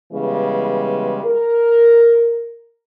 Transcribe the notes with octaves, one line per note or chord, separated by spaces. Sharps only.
C#3 E3 G3 G#3 B3
A#4